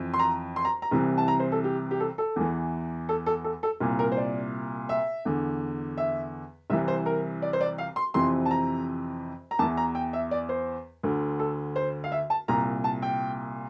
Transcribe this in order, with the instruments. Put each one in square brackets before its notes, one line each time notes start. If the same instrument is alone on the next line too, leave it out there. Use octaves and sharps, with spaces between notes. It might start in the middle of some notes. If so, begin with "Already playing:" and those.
Already playing: [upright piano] F2 E3
C6
A#5
C6
A#5
A#5
C2 C3 E3
A5
A#5
C5
A4
G4
G4
A4
A4
E2 E3
A4
A4
A4
A4
C2 A#2
A#4
C5
D5
E5
E2 D3
E5
C2 C3 E3 E5
C5
A#4
D5
C5
D5
F5
C6
F2 C3 E3 C6
A5
A#5
A#5
E2 A5
E3
A#5
G5
E5
D5
C5
D2 D3
A4
C5
F5
E5
A5
C2 A#2 A#5
A5
G5